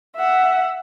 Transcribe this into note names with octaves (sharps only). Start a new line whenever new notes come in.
E5 F#5